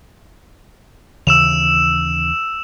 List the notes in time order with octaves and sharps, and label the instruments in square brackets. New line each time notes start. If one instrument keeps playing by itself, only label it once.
[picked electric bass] D#2 C#3 E3 [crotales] E6 E7 F7